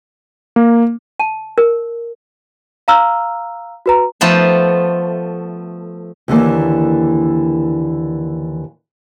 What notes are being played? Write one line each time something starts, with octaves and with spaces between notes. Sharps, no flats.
A#3
A5
A#4
F5 A#5 E6 F6
F#4 B4 A#5
F3 A3 B3 C5
D#2 D3 E3 A#3